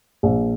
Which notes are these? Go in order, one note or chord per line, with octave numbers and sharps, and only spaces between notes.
A#1